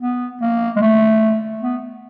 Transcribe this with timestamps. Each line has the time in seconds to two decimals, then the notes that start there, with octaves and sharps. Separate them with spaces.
0.01 B3
0.42 A#3
0.76 G#3
0.81 A3
1.62 B3